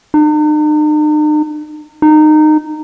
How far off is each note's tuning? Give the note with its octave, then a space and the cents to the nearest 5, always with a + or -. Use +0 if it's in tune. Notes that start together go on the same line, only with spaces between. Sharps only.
D#4 -45
D#4 -20